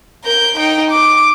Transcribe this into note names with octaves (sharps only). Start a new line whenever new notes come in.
A#4 G6
D#4 G5
D6